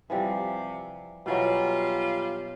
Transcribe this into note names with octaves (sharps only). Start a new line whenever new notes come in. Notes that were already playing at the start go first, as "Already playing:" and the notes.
C3 E3 F3 G3
B2 E3 F#3 G3 F4